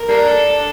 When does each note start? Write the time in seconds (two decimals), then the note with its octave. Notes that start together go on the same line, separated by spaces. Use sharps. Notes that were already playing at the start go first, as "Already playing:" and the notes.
Already playing: A#4
0.08 G3 A#3 D4
0.27 A4